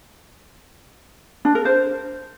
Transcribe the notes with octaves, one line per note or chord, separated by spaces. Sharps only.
D4
A#4
C5